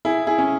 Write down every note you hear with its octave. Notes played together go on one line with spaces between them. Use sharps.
E4 G#4
E4 G#4
C#4